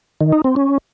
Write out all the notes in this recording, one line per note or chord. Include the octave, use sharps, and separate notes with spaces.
D#3
D#4
C4
C#4